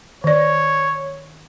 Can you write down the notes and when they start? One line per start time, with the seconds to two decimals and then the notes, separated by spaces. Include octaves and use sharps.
0.24 D#3 C#5 D5